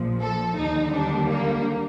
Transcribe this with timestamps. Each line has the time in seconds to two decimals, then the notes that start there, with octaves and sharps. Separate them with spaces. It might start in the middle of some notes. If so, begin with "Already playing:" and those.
Already playing: A#1 A#2 F3
0.21 A4
0.56 D#2 D3 G3 D#4
0.93 D4
1.29 A#3